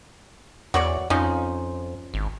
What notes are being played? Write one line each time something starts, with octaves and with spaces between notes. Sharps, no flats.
E2 F#4 C#5 D5
F2 F3 C#4 D#4
G#1